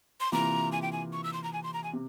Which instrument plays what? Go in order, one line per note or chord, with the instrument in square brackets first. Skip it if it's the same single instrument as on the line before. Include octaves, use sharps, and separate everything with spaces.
[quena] C6
[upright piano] C3 E3 A#3 F4 [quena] A#5
[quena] G#5
G5
G#5
C#6
E6
C6
A#5
G#5
C6
A#5
G#5
[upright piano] C3